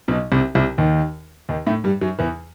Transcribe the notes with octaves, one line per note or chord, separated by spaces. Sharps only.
B1 B2
C2 C3
C2 C3
D#2 D#3
D#2 D#3
A2 A3
G2 G3
F#2 F#3
E2 E3